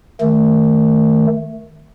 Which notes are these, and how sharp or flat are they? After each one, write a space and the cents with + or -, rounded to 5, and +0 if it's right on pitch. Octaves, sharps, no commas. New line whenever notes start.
D#3 +0 A3 +0